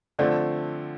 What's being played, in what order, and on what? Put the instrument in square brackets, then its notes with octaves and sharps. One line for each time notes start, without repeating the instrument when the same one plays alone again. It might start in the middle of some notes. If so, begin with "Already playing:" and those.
[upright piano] D3 F3 A3 C4 [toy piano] D5